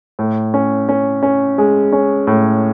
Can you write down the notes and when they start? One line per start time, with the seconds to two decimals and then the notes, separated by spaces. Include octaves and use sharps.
0.19 A2
0.54 C#4
0.89 C#4
1.23 C#4
1.58 G#3
1.93 C#4
2.27 A2